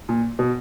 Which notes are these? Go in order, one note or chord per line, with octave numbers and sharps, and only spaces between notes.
A#2
B2